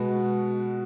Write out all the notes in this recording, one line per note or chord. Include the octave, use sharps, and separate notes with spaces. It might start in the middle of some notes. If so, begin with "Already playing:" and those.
Already playing: B2 G#3 B3 F#4